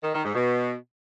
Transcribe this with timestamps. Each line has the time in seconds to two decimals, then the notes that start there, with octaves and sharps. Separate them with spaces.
0.03 D#3
0.14 D#3
0.24 G#2
0.35 B2